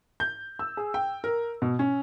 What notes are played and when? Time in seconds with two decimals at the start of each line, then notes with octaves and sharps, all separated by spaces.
0.20 G6
0.59 E6
0.77 G#4
0.94 G5
1.24 A#4
1.62 B2
1.79 C#4